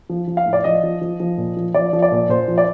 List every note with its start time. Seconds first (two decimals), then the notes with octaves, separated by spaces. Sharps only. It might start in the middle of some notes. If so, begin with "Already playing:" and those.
0.09 F3
0.27 F3
0.37 F5
0.46 A2
0.53 D5
0.64 F3 D#5
0.83 F3
1.01 F3
1.20 F3
1.37 A#2
1.57 F3
1.74 F3 D5
1.93 F3
2.02 D5
2.12 A#2
2.29 A#2 C5
2.48 F3
2.58 D5